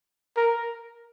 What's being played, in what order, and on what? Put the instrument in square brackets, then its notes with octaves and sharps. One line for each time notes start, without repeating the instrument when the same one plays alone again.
[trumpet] A#4